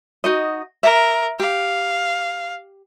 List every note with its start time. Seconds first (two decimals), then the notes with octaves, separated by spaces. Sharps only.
0.24 D#4 F#4 D#5
0.83 A#4 E5
1.40 G4 F5